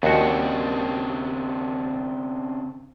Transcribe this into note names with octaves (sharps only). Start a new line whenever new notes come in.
D#2 C#3 C4 D4 F#4